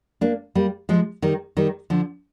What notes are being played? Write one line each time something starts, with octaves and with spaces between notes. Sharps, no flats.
A#3 D4
G3 A#3
F3 G#3
D#3 G3
D#3 G3
D3 F3